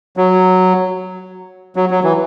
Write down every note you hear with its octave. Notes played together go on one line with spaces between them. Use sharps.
F#3
F#3
F#3
E3